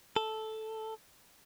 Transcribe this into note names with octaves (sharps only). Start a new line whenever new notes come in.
A4